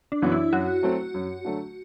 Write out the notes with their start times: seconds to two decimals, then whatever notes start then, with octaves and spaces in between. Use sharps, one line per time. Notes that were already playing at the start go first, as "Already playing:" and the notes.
0.12 D4
0.22 F#2 E3 B3 F#4
0.32 E4
0.52 F#2 F#4
0.83 F#3 A3 C4
1.14 F#2
1.45 D3 F#3 A3